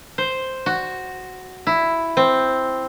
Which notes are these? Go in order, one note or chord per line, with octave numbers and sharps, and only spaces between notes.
C5
F#4
E4
C4